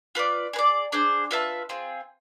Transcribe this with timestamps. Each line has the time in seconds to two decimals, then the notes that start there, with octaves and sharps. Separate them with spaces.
0.15 F4 B4 D5
0.53 G#4 B4
0.59 D5
0.92 D4 G#4 C5
1.31 F4 B4 E5 A5
1.69 C4 F4 G#4